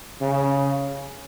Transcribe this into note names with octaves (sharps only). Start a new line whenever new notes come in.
C#3